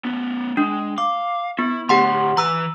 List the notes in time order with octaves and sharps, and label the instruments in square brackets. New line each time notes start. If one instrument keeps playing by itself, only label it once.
[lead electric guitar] B3 C#4
[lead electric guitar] G#3 [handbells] D4
[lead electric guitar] F5 [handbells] D6
[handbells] B3 [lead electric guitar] E4
[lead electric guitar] D2 A2 [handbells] G4 F#5 C6
[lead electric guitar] E3 B4 [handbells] A#5 E6